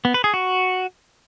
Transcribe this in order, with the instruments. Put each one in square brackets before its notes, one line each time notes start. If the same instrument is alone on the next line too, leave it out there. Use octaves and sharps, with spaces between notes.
[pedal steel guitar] B3
B4
G#4
F#4